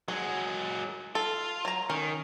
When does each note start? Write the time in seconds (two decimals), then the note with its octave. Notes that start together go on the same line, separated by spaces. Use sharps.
0.08 F#3 G#3 G#4
1.15 F4 A4
1.65 F#3 A#5
1.90 D#3 C#4